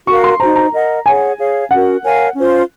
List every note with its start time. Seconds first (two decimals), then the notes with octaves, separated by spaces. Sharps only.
0.07 F#4 A#4 F5 C#6
0.24 C6
0.40 D#4 F#4 C5 A#5
0.56 A#5
0.73 A#4 D#5 F#5
1.05 G#4 C#5 F#5 G#5
1.38 G#4 C#5 F5
1.70 C#4 F#4 A#4 F#5
2.03 A#4 C#5 F5 G#5
2.35 C#4 F4 C5